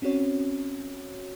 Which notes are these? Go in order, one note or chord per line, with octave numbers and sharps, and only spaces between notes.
C4 C#4 F#4 C#5